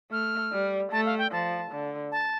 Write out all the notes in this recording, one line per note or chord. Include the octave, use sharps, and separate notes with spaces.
A3 F6
G3
A3 A5
F5
G5
F3 A5
D3
A5